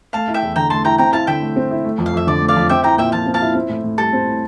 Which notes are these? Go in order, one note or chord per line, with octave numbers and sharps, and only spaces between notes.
A3 F5 A5
E4
E5 G5
E2
D3 G5 A#5
A3 A5 C6
E4 G5 A#5
C4 G5 A#5
E4 F5 A5
D3 E5 G5
A3
C4
E4
A3
F2
F5
F2 E5
D3 D5
A3
D5 F5
F2
C4 E5 G5
E4 G5 A#5
A#2 E5 G5
F3 F5 A5
C4
F5 A5
E4
C4
A2
A2
G3 A4
C4
A2